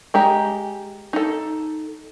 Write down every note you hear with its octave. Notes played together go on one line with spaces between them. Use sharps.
G#3 G4 A#5
D#4 A4